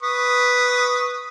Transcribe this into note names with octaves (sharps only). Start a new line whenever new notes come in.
B4 C#6 D#6